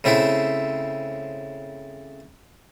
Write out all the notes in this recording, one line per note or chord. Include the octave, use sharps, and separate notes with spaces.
C#3 A3 C4 E4